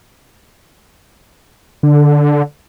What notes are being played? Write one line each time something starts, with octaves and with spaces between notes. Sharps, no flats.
D3